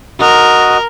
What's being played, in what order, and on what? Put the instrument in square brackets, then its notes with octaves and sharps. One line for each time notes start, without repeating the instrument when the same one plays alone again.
[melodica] F#4 D#5 [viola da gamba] A#4